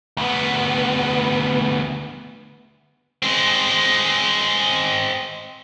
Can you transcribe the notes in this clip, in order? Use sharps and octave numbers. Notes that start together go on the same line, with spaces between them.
D2 B3
G#3 C4